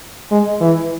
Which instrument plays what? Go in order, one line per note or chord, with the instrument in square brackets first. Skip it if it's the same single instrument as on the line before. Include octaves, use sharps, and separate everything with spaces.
[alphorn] G#3
E3